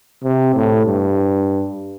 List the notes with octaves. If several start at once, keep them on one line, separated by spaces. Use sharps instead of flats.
C3
A2
G2